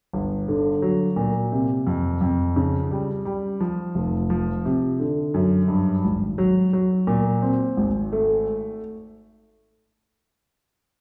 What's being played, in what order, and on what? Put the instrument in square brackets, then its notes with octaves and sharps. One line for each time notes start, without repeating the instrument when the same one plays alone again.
[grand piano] G1
D3
F#3
A#2
C3
F2
F2
C#3
G3
G3
F3
F1
F3
C3
D3
F#2
G2
G#1
F#3
F#3
A#2
C4
G#1
A3